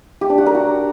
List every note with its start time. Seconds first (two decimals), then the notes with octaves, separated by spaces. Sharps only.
0.21 G4
0.30 D4
0.38 F#4
0.46 A#4
0.55 F#4